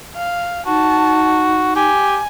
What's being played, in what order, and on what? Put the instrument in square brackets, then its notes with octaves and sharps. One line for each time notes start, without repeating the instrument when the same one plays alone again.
[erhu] F5
[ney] D#4 [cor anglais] F#4 [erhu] A5
[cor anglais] G4 [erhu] G#5